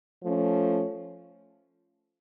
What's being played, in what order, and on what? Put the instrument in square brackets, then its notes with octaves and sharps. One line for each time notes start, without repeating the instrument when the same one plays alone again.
[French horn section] F3 A3 C#4